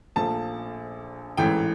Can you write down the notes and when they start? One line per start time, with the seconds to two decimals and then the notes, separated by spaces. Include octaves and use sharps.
0.16 A#1 A#2 F3 A3 A5
1.37 A1 G#2 E3 A3 G5